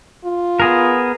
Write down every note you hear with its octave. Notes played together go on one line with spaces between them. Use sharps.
F4
B3 G#4 A#4